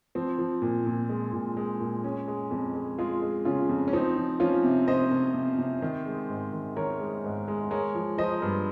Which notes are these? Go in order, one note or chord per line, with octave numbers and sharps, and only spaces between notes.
F3 C4
F3
A#2
A#2
G#3
A#2
G#3
A#2
G#3 C#4
G#3
F2
G#3
G#3 F4 G#4
G#3
C#3 C#4 F4
F2
C#4
F3 C4 D#4
F3
F3 C#4 F4
C3
C3 C5 D#5
C3
C3
C3
D#3
G#3
G#2
D#3
D#3 A#4 C#5
G#3
G#2
G#3
G#3 A#4 C#5
F3
F3 C5 D#5
G2